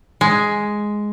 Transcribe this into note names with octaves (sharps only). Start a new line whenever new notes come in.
G#3